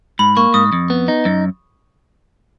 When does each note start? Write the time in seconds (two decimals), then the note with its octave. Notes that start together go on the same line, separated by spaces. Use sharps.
0.19 G#2 B5
0.37 A#3 C#6
0.54 G#2 D#6
0.72 F2
0.90 B3
1.08 D#4
1.25 F#2